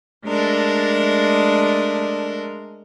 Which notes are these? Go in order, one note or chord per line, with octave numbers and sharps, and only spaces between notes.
G#3 A3 D4 A#4